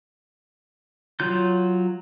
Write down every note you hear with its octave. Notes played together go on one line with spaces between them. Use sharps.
F#3 F4 G6